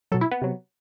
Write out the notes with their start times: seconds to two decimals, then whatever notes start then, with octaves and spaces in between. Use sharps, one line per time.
0.12 B2 F#3 A4
0.21 E4
0.31 B3
0.42 C3 F#3